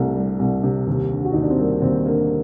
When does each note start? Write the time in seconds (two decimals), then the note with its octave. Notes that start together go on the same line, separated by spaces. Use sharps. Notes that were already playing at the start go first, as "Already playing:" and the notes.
Already playing: C2 C3 A3
0.16 G3
0.39 C2
0.63 C3
0.87 D#2
1.11 D3
1.25 F#4
1.33 D#2 D#4
1.42 D4
1.50 C4
1.58 G3 A#3
1.82 D#2 C4
2.06 D3 A#3